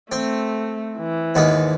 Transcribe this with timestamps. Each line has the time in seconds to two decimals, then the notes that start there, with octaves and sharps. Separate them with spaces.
0.12 A3 C4
0.98 E3
1.35 D#2 G#2 B3